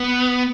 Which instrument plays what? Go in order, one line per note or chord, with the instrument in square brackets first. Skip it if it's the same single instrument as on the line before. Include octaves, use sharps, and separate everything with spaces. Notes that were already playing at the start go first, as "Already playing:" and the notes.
Already playing: [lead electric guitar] B3